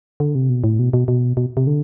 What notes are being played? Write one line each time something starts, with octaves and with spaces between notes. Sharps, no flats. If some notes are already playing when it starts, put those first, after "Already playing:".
D3
C3
B2
A2
B2
B2
B2
B2
C3
D3